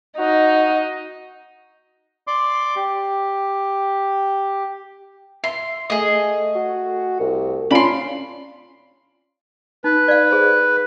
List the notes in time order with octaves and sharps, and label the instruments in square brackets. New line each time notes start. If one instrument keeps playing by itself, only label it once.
[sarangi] D#4 [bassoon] F#4
[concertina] D5 C6 D6
G4
[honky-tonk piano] E5 [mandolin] C6
[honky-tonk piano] A3 [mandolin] G#4 D#5
[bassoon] F#4
C2
[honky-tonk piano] C#4 F4 D7 [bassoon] D4 [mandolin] B5 C6
[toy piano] D#4 [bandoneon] B4
[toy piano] D5 F5
G#4 C5